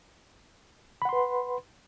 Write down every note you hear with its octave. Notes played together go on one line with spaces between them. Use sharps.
B4 F#5 B5 C6